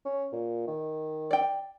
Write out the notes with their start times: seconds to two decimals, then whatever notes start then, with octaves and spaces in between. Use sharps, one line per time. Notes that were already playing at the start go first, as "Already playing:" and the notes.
0.05 C#4
0.33 A#2
0.68 D#3
1.31 D5 G5